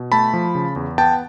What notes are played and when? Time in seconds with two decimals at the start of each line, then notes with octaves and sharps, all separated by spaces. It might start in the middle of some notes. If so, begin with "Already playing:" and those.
Already playing: B2
0.12 A3 A5 B5
0.34 F3
0.55 C#3
0.76 E2
0.98 B3 G5 A5